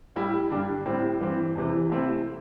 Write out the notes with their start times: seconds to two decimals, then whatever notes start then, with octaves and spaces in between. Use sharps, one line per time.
0.16 A2 G3 E4
0.50 G2 D3 G3 D4
0.86 A2 G3 C4
1.20 G2 E3 C4
1.56 E2 C3 E3
1.90 C3 A3 C4 E4